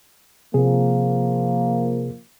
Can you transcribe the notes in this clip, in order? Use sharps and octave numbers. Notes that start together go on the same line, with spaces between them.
C3 F3 A#3 G#4